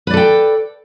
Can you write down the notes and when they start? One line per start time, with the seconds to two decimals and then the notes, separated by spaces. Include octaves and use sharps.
0.07 B4
0.10 D5
0.14 A4
0.17 G5